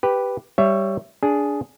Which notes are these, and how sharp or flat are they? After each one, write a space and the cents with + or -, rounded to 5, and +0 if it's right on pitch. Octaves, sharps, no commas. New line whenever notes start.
G4 +0 B4 +0
G3 +0 C#5 +0 E5 +15
D4 -15 G#4 +0